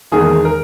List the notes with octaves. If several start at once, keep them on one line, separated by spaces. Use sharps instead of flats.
E1 E2 D#3 A#3 G#4
A#4